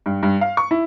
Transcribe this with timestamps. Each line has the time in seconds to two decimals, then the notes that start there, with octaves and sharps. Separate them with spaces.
0.06 G2
0.23 G2
0.41 F5
0.57 C#6
0.71 E4